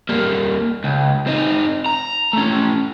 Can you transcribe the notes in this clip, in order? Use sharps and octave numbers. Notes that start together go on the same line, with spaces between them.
G3 A#3
C#2
C4 D#4
A#5
A3 C#4